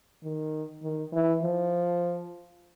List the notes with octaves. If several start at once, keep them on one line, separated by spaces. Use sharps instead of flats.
D#3
D#3
E3
F3